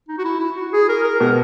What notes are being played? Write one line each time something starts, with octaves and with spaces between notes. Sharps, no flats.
D#4
F#4
E4
E4
F#4
G#4
A#4
A#4
B2 A#4